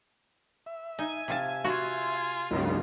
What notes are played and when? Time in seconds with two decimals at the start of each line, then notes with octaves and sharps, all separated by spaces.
0.66 E5
0.99 D#4 G#5
1.28 C3 F4 A5
1.65 F4 F#4
2.51 C#2 G2 C#3 F#3 A#3 D#4